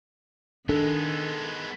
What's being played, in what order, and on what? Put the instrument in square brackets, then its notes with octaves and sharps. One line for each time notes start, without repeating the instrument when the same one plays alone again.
[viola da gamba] D#3 [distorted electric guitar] G#3 B3 [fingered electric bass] D4 [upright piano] A4